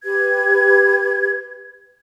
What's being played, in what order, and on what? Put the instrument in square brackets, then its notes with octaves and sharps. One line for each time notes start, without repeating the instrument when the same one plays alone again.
[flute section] G4 B4 G#6